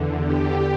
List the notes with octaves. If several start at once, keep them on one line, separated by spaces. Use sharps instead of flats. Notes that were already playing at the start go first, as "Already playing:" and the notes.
Already playing: E2 D3
G4